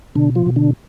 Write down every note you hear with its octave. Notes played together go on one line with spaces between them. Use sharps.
B2 D3 D4
F3 F4
B2
D3 D4